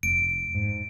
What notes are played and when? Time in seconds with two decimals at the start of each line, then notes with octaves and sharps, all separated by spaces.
0.03 F1 D7
0.55 G#2